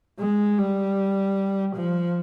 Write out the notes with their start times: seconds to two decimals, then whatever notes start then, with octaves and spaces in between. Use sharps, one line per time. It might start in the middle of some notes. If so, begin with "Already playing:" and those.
0.19 G#3
0.58 G3
1.76 F3